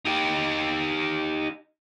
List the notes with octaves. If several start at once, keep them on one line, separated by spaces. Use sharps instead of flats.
D#4 G4